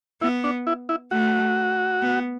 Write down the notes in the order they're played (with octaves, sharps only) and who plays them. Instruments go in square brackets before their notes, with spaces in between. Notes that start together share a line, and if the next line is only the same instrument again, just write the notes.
[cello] B3 [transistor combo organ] E4
[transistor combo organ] D4
E4
E4
[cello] A3 [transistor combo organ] F#4
[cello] B3